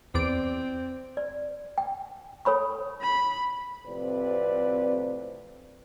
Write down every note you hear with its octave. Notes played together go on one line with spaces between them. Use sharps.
E2 C4 D5 D7
D5
G5
A4 C#5 B5 C#6
B5
A2 C3 F3 C4 B4 D5